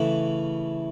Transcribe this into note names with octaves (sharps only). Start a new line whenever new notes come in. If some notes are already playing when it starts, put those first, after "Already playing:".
Already playing: C#3 E3 A3 E4